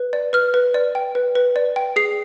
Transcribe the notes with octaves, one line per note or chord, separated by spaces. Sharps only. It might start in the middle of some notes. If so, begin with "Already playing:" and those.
Already playing: B4
D5
B4 F6
B4
D5
G5
B4
B4
D5
G5
G#4 C7